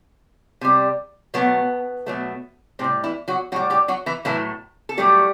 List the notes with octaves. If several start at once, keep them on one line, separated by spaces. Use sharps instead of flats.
C3 G3
B2 F#3 A3 B3
B2 F#3 A3
A2 C3 G3 C4
E3 E4
F#3 F#4
A2 F#3 G3 F#4
G3 G4
F#3 F#4
E3 E4
A2 E3 F#3 A3 E4
A4
A2 F#3 G3 A3 G4